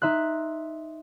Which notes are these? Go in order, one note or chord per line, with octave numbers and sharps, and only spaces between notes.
D#4 E5 C6 F#6